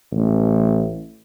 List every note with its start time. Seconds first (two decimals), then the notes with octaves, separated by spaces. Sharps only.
0.12 A1